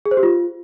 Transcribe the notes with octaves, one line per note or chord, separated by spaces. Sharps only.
G#4
C5
G4
F4